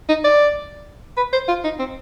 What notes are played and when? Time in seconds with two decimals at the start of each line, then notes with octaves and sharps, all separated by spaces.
0.09 D#4
0.24 D5
1.17 B4
1.33 C5
1.48 F4
1.64 D#4
1.79 C4